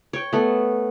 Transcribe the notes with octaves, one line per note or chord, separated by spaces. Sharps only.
C#5 G5
A3 B3